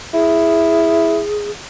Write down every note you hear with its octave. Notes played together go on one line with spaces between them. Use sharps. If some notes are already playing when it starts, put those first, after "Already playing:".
E4 G#4